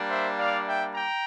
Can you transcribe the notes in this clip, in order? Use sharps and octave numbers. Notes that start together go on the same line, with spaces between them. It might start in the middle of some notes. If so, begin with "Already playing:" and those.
Already playing: G3 A#3 D4
C5 E5
D5 F5
E5 G5
G5 A#5